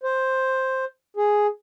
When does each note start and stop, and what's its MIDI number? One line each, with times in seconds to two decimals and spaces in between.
0.03 0.85 72
1.17 1.47 68